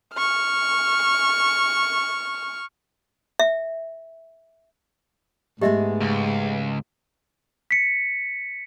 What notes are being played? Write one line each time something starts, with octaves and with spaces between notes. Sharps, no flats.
C#6 F6
E5
G#2 G#3 A3 B3 G4 D#5 E5
C#2
B6 C#7